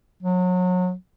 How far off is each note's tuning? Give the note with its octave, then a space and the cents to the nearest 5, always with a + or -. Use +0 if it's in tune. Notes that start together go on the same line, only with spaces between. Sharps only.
F#3 -30